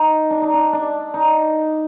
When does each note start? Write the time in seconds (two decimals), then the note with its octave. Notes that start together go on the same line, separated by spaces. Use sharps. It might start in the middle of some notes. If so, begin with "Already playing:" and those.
Already playing: D#4
0.31 D4
0.42 D#4
0.54 D4
0.73 D4
1.14 D#4